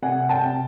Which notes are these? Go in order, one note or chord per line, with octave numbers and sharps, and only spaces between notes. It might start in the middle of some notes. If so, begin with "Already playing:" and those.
C3 F#5 G#5
G5 A5
C3